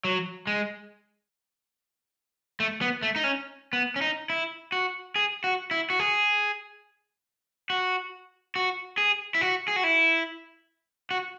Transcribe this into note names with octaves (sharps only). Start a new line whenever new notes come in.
F#3
G#3
A3
B3
A3
D#4
C#4
B3
C#4
D#4
E4
F#4
G#4
F#4
E4
F#4
G#4
F#4
F#4
G#4
E4
F#4
G#4
F#4
E4
F#4